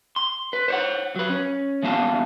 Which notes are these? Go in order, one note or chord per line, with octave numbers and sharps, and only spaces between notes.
C6
B4
C5 C#5 F#5
F#3 B4
C#4
A#2 E3 B3 F5 A5